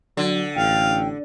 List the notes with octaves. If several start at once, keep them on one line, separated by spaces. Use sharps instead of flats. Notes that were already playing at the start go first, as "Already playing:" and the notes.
D3 F#3
A1 F5 G5